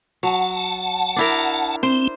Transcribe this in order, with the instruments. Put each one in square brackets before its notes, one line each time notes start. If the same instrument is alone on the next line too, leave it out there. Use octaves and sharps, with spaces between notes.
[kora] F#3 [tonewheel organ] F#5 A5
[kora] D4 E4 A#4
[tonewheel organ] C4 [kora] C5